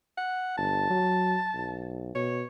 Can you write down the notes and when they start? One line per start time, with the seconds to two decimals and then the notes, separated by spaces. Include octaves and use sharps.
0.18 F#5
0.57 G1 A5
0.90 F#3
1.54 B1
2.15 B2 C#5